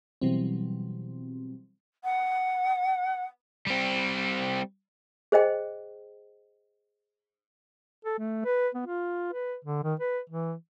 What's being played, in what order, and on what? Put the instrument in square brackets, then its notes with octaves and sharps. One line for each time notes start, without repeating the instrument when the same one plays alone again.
[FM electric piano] B2 E3 F#3 G3 C4
[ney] F#5
[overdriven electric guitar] G3 C4
[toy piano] G#4 C5 D#5 G5
[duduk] A4
A3
B4
B3
F4
B4
D3
D#3
B4
E3